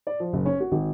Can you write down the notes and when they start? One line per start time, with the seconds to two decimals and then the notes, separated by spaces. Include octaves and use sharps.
0.07 D5
0.20 F3
0.33 F#1
0.46 C#4
0.60 F#4
0.72 G#1